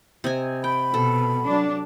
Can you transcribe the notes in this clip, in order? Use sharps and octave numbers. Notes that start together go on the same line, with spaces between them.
C3 D#5 G#5
G5 B5
B2 A4
F#3 D4